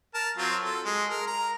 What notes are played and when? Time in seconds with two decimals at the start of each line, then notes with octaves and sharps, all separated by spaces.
0.14 A#4 A5
0.37 F#3 C4 F4
0.62 A4
0.85 G#3
1.10 A#4
1.27 A#5